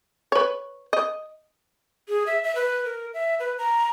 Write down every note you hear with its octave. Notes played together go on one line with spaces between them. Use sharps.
B4 C#5
D#5
G#4
E5
E5
B4
A#4
E5
B4
A#5